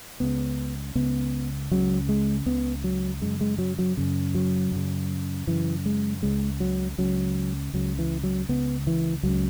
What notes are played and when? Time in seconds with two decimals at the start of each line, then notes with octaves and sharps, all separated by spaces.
0.20 C#2 C#3 B3
0.95 C#2 C#3 B3
1.71 C#2 C#3 F#3
2.09 G#3
2.46 C#2 C#3 B3
2.84 F#3
3.21 F#2 C#3 G#3
3.41 G#3
3.59 F#3
3.79 F#3
3.97 F#2 C#3
4.35 F#3
4.72 F#2 C#3
5.47 F#2 C#3 E3
5.86 G#3
6.22 C#2 C#3 G#3
6.60 F#3
6.98 C#2 C#3 F#3
7.73 C#2 C#3 F#3
7.99 E3
8.23 F#3
8.49 C#2 C#3 B3
8.87 E3
9.23 C#2 F#3
9.29 C#3